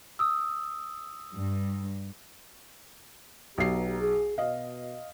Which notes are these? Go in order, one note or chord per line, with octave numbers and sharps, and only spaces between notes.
D#6 E6
G2
B1 B3 G4 A#5 C7
G#4
B2 D#5 F5